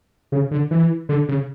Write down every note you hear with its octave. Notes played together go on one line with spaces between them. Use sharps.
C#3
D3
E3
D3
C#3